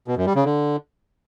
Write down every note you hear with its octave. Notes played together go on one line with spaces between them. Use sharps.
B2
F#2
G3
C#3
D3